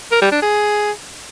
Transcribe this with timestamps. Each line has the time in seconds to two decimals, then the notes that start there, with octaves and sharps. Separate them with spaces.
0.12 A#4
0.22 G3
0.32 D4
0.42 G#4